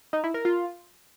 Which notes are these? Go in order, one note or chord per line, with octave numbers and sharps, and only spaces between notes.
D#4
E4
A#4
F4